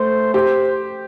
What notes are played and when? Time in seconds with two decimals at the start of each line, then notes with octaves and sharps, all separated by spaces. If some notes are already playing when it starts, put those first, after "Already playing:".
Already playing: A3 C5
0.34 G4 C5